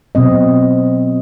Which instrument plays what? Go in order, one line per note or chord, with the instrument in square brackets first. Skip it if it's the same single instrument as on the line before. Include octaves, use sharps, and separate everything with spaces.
[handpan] B2 F#3 C4 D#5